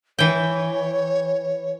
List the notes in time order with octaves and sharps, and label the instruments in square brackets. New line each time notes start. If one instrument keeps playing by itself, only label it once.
[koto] E3 G5 [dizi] C#5